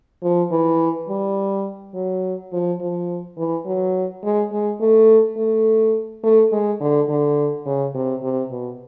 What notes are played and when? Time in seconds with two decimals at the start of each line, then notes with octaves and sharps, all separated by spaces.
0.23 F3
0.51 E3
1.09 G3
1.94 F#3
2.52 F3
2.81 F3
3.37 E3
3.66 F#3
4.24 G#3
4.52 G#3
4.80 A3
5.37 A3
6.23 A3
6.52 G#3
6.80 D3
7.09 D3
7.66 C#3
7.94 C3
8.22 C3
8.51 B2